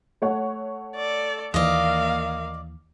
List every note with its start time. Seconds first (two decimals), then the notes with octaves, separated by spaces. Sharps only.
0.22 A3 C#5 F#5
0.95 A4 D5
1.54 D#2 E3 A#3 D5 D#5 F5